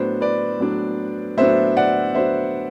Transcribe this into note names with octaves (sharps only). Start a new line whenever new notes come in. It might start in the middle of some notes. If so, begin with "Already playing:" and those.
Already playing: A2 F#3 B3 D4 C5
B4 D5
A2 F#3 B3 D4
A2 F#3 B3 D4 C5 E5
D5 F#5
A2 F#3 B3 D4 C5 E5